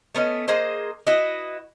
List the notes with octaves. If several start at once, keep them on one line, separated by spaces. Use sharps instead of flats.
A3 B3 C#4 D#5
A#3 G#4 C5 D#5
E4 F#4 B4 D#5